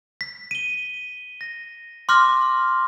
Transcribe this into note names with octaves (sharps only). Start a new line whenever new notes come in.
B6
D#7 G7
A#6
C6 D6 F6 F#6 A#6